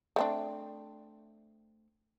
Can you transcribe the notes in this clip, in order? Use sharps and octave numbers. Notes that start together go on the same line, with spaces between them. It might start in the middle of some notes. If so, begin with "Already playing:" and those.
A3 C4 D4